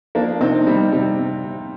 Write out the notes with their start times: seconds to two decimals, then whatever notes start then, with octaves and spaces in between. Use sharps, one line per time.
0.15 F3 A#3 D4
0.40 C3 C4 D#4
0.67 C3 G3
0.92 C3 G3
1.19 C3
1.44 C3